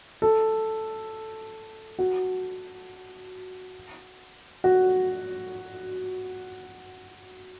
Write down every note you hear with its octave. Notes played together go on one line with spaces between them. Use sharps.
A4
F#4
F#4